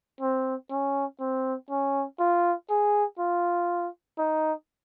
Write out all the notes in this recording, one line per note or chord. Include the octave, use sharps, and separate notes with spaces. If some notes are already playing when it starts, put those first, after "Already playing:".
C4
C#4
C4
C#4
F4
G#4
F4
D#4